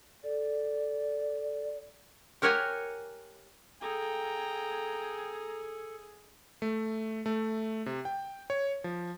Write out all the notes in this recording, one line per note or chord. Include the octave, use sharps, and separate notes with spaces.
A4 D5
G4 A#4 C#5 F#5 G#5
G#4 A4 G5 A#5
A3
A3
C3
G5
C#5
F3